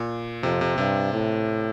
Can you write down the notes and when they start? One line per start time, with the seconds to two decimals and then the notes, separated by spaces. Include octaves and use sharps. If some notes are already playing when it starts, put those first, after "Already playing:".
Already playing: A#2
0.43 F2 C3
0.61 C3
0.78 G2 C3
1.13 A2